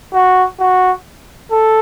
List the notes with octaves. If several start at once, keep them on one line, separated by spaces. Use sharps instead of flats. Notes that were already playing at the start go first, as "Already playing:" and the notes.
F#4
F#4
A4